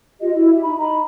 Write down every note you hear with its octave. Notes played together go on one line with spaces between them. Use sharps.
F4 G4 D#5
E4 F#4
G4 E5
D#4 B5
D#4 D#5 A#5 B5